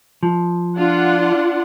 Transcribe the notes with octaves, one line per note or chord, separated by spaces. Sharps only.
F3
D4 F4 F#5